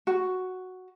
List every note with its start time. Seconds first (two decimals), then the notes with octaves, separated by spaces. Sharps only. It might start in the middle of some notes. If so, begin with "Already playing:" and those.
0.07 F#4